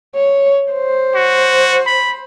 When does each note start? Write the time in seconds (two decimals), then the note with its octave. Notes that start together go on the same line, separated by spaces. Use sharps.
0.15 C#5
0.73 C5
1.15 F#4
1.86 B5